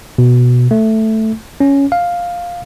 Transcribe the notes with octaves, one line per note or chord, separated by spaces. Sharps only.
B2
A3
C#4
F5